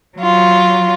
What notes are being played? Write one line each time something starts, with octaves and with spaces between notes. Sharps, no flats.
F#3 F4